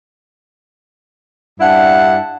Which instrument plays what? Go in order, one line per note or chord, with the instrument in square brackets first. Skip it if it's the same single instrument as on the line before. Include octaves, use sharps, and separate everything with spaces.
[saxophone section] G2 D4 E4 F#5